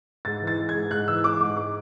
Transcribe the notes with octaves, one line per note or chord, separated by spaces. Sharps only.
G#2 A6
E3
A6
G#3
G#6
G#2
G#2 F#6
E3 E6
G#3 D6
G#2 D6
D6